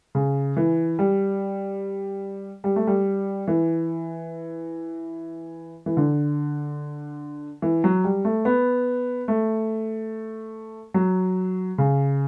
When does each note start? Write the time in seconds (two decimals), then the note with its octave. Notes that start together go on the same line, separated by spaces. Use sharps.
0.15 C#3
0.57 E3
0.99 G3
2.64 G3
2.76 A3
2.87 G3
3.48 E3
5.86 E3
5.97 D3
7.62 E3
7.84 F#3
8.04 G3
8.25 A3
8.45 B3
9.28 A3
10.94 F#3
11.78 C#3